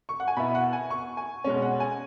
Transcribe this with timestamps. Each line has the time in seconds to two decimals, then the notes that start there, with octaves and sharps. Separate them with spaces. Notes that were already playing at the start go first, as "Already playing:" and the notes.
0.09 C#6
0.20 F#5
0.28 G#5
0.37 B2 B3 E4 B5
0.55 F#5
0.73 G#5
0.91 C#6
1.17 G#5
1.44 B2 G#3 C#4
1.62 F#5
1.80 G#5